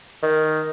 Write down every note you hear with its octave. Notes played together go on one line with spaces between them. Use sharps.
D#3